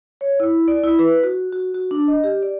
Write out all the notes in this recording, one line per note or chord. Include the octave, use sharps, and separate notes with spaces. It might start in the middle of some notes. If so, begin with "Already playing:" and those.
C#5
E4
D5
E4
B4
F#4
F#4
F#4
D4
D#5
G4
D5